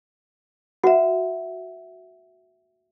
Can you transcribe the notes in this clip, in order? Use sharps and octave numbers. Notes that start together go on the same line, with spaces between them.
F#4 B4 E5 F#5